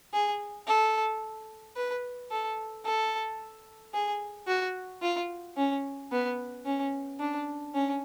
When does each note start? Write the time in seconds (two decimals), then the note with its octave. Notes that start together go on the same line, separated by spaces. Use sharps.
0.13 G#4
0.67 A4
1.76 B4
2.31 A4
2.85 A4
3.94 G#4
4.47 F#4
5.02 F4
5.57 C#4
6.12 B3
6.65 C#4
7.20 D4
7.74 C#4